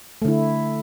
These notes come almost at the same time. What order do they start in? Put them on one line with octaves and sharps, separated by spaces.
A3 D3 E4